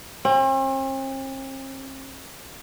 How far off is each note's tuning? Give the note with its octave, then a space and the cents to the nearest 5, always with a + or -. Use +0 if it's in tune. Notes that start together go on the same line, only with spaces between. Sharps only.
C4 +45